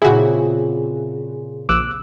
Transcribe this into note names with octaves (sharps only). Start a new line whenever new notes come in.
A#2 C#3 C4 E4 F#4 G#4
A#1 D6 E6 F#6